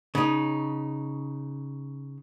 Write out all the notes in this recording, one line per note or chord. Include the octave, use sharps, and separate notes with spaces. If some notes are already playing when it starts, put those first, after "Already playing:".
C#3 D#4